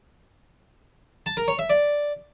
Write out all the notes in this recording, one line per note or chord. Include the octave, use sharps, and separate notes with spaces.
A5
A#4
C#5
E5
D5